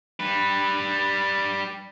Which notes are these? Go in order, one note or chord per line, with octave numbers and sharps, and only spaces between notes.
G3 B4